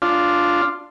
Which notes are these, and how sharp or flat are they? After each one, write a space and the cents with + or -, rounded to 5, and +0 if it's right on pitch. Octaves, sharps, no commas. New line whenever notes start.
D4 +0 F4 +0